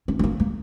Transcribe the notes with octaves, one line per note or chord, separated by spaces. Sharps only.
C#4
C4
A#3
A#3